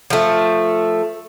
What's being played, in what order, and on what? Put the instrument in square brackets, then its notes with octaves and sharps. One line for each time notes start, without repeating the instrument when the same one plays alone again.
[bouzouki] F3 A3